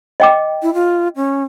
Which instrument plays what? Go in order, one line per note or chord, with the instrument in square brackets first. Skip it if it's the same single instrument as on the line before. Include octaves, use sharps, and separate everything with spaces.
[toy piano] D#5 G5 D6
[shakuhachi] E4
F4
C#4